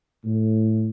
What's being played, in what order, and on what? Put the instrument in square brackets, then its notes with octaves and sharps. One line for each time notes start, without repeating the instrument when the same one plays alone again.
[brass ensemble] A2